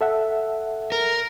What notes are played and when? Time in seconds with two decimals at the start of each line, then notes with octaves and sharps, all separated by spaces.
0.01 A4 E5 F#5
0.92 A#4